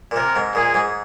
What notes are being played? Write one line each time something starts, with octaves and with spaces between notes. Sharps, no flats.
A#2
C3 A#4
G#2
A#2 G#4
G#2